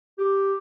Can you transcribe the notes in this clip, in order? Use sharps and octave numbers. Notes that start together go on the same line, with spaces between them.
G4